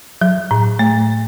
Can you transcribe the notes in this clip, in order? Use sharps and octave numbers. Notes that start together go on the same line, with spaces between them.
F#3
A2
A3